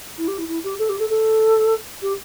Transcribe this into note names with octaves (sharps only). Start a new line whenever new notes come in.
E4
G4
E4
E4
G4
A4
G4
A4
A4
G4